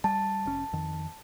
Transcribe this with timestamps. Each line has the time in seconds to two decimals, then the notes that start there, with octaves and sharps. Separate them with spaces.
0.04 G3 A5
0.46 F1 C#4
0.73 F2 D#3